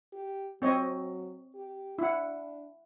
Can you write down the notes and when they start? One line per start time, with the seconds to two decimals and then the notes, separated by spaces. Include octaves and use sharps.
0.13 G4
0.62 F#3 C4 C#5 D#5
1.55 G4
1.99 D4 E4 F#5